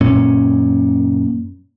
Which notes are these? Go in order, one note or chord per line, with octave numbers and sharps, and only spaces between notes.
F#2 A#2 C#4